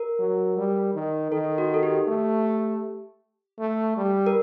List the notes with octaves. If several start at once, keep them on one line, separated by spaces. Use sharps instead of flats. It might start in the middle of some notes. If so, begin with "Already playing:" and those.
Already playing: A#4
F#3
G3
D#3
D#3 A4
F#4
A4
G4
A3
A3
G3
A#4